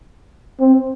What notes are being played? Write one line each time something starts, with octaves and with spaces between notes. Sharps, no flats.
C4